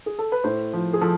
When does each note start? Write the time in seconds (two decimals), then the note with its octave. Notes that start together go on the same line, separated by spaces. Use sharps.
0.06 G#4
0.19 A4
0.32 B4
0.44 A2 C5
0.73 F3
0.93 G#4
1.01 F3 A4